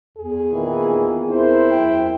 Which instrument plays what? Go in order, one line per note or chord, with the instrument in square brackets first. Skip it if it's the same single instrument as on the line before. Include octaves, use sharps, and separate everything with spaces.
[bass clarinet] E2 [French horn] G#4
[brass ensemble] A#2 D#3 E3
[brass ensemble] C4 A#4 C5 [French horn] E4
[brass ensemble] F#2 G5